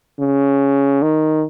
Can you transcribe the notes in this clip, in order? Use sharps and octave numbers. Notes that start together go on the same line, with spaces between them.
C#3
D#3